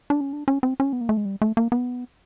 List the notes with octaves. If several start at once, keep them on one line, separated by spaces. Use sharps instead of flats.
D4
C#4
D4
C#4
C4
C#4
B3
A#3
A3
G#3
G3
A3
A#3
B3